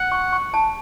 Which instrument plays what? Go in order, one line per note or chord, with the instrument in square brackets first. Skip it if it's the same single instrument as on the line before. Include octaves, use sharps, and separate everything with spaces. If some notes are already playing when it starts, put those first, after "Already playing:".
Already playing: [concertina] F#5
[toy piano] C#6
C#6
A5